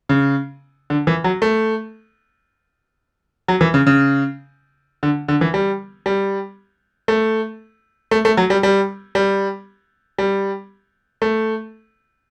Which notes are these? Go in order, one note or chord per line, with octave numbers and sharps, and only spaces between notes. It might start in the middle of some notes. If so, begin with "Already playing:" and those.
C#3
D3
E3
F#3
A3
F#3
E3
C#3
C#3
D3
D3
E3
G3
G3
A3
A3
A3
F#3
G3
G3
G3
G3
A3